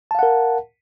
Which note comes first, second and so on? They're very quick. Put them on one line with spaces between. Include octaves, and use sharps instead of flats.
A5 F5 F#5 A#4